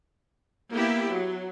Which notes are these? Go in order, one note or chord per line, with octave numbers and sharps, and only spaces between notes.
A#3 B3 E4 G4
F#3